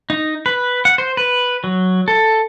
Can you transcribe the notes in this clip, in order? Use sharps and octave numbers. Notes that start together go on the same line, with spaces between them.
D#4
B4
F#5
C5
B4
F#3
A4